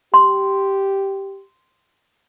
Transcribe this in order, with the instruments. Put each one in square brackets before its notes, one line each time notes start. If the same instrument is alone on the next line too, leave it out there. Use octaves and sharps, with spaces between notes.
[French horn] G4 [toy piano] C6